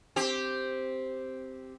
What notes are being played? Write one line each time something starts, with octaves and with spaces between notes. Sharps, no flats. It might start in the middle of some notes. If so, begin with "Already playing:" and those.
C4 G4